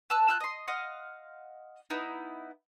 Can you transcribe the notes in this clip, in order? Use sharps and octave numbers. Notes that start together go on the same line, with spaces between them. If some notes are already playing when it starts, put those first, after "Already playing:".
B4 A5 E6 F#6
F4 E6 F#6 G6
D#5 C6
D#5 F5 F#5 C6
B3 D#4 E4